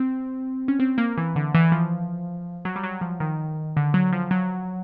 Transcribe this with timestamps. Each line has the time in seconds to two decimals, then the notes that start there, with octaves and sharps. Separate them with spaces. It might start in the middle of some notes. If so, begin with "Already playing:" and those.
Already playing: C4
0.68 C#4
0.80 C4
0.98 A#3
1.17 E3
1.36 D3
1.54 E3
1.72 F3
2.65 F#3
2.76 G3
2.83 F#3
3.01 F3
3.20 D#3
3.77 D3
3.94 F#3
4.12 F3
4.31 F#3